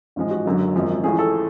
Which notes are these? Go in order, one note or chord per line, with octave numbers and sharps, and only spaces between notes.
A1 G#2 F3 G#3
F#4
F#1 F#2 D3 F#3
G#1 F#2 F3 G#3
A1 A2 F3 G#4
A4